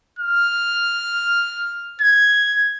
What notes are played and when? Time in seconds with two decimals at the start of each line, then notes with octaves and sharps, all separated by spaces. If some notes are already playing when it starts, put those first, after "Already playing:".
0.19 F6
2.01 G#6